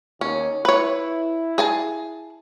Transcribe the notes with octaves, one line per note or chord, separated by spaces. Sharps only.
D#2 C#4
E4 B4 C#5
G#4 G#5 A5